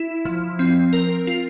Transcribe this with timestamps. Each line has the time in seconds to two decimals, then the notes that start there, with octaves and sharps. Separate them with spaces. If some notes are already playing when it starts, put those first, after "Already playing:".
Already playing: E4
0.25 F3
0.59 C4
0.93 A#4
1.27 F4